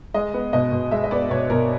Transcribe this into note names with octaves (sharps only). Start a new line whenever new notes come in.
G#3 D#5
B3
B2 D#5
B2
G#3 E5
D#5
B3 D5
B2 C#5
B2 A#4